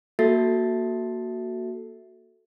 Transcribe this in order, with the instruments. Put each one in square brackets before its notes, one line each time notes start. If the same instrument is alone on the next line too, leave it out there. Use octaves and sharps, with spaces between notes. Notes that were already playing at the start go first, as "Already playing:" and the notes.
[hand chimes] A#3 F#4 A4 E5 A6 C7